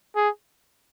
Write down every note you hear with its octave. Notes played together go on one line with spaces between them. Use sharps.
G#4